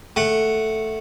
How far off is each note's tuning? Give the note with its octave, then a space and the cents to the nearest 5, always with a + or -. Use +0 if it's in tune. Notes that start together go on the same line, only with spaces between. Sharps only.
A3 +0 F#5 +0